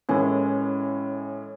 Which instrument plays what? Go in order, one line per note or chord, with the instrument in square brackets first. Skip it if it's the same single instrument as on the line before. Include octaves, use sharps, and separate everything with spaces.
[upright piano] A2 E3 G#3 [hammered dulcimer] C#4